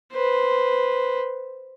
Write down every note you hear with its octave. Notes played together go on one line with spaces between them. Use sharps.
B4 C5